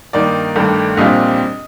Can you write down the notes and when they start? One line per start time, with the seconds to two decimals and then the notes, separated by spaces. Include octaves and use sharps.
0.13 G2 D#3 A#3 D#4 D5
0.56 G1 G2 D#3 A3 D4
0.97 A#1 A#2 G3 C4 F4 D#5